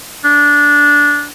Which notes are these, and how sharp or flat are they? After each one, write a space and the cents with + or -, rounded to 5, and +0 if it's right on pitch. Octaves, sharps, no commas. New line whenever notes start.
D4 -15